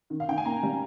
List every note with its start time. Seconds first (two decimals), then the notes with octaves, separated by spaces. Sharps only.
0.10 D#3
0.20 F5
0.28 D#3 G5
0.38 G#5
0.45 A#3 A#5
0.63 G3